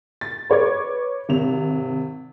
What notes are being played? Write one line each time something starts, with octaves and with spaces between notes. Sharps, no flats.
A6
B4 C#5 D6 G#6
G#1 C3 F7